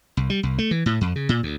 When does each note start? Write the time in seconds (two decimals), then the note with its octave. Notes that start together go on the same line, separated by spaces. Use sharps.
0.17 C2
0.30 G3
0.43 C2
0.58 A3
0.71 E3
0.86 A2
1.01 F2
1.16 C#3
1.29 A#2
1.43 D2